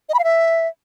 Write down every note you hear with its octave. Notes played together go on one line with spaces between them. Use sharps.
D#5
B5
F5
E5